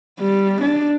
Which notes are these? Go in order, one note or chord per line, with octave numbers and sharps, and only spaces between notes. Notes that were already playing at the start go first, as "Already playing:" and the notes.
G3
D4